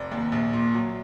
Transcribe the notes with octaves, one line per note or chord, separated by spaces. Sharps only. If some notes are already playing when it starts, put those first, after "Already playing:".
Already playing: F1 D5
D#2
A#1
A#2
F#3